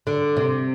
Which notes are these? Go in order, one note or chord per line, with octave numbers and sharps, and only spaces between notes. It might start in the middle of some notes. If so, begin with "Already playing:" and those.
D3
C3